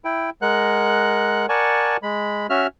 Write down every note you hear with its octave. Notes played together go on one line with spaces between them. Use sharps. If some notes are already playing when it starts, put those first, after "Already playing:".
E4 G5
G#3 A#4 F#5 F#6
A#4 D5 F#5 G#5 A5 C#6
G#3 B5
C#4 F#4 E5 F6